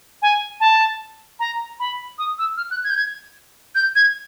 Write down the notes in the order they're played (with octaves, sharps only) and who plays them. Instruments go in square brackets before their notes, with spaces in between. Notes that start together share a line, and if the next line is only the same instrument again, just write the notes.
[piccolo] G#5
A5
A#5
B5
D#6
E6
F6
F#6
G#6
G6
G#6
G6
G#6